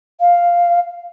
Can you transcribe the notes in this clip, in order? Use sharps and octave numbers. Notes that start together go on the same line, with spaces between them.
F5